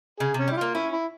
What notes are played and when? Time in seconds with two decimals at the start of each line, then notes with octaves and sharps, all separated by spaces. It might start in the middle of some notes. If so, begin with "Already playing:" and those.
0.20 C#3 G#4
0.34 C3 C#4
0.48 G3 E4
0.57 A#3 F4
0.75 C#4 E4
0.93 E4